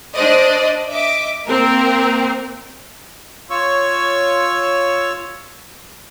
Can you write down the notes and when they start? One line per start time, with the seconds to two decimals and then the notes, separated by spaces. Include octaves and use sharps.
0.15 D4 C5 D5 D#5
0.91 D#5 E5 D6
1.47 A#3 C4 A#4
3.50 F4 C#5 C#6 E6